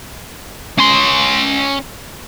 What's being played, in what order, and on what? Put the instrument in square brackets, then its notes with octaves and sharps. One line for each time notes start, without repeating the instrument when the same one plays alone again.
[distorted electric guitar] C#4 C6